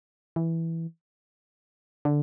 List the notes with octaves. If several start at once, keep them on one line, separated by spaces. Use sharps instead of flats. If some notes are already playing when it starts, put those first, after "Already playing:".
E3
D3